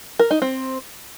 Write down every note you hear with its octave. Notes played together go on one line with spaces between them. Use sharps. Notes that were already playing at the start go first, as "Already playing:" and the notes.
A#4
D#4
C4